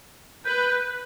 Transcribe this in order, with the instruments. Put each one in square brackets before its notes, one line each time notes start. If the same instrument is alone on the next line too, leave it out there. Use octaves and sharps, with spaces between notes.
[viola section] B4 [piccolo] G6